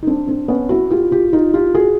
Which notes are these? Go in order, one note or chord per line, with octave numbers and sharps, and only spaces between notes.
D#4
C4 D4
C4 D4
B3 C#4
E4 F#4
F4 G4
F4 G4
D#4 F4
F4 G4
F#4 G#4